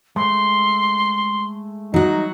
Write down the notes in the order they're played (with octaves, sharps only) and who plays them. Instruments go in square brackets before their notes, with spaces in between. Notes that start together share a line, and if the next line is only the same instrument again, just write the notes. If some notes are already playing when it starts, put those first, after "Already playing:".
[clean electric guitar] G#3 A3 [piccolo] C6
[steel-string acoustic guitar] F#3 F#4 [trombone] D#4